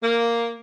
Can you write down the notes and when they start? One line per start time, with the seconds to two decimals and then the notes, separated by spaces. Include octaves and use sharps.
0.03 A#3